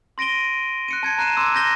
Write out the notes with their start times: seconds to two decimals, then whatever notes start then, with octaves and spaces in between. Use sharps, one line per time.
0.18 C6 A#6 D7 D#7 G7
0.88 F#6 C#7 D#7
1.03 A5 G#6 C#7
1.18 A5 A#5 F#6 C7 D#7 E7
1.37 C6 D6 E6
1.55 G6 A#6 G7